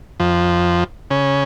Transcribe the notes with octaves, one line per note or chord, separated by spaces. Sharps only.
F2 F3
C#3 C#4